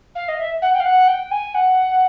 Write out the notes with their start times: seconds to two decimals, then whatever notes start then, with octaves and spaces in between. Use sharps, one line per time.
0.15 F5
0.28 D#5
0.39 E5
0.62 F#5
0.74 G5
0.80 F5
0.85 F#5
1.08 G5
1.31 G#5
1.54 F#5